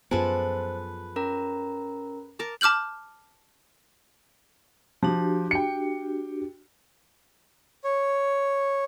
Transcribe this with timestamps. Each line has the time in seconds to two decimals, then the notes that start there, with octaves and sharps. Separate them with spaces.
0.11 F#2 F3 B3 G#4 A4 B4 C5
1.16 C#4 A#4 A#5
2.39 A#4 A5 D6
2.61 A5 D6 F6 G6 F#7
5.03 F3 D4 F#4 G4
5.51 G5 C#7
7.84 C#5